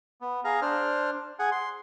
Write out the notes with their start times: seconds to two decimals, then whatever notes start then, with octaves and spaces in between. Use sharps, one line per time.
0.21 B3
0.44 G#4 F5 A#5
0.62 D4 C5 F6
1.39 G#4 F#5 G#5
1.52 C6